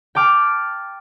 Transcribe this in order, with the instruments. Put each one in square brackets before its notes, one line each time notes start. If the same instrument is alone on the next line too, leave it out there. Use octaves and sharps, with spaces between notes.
[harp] G5 A5 D6 F6